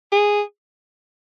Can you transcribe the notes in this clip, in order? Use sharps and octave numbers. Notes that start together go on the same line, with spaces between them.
G#4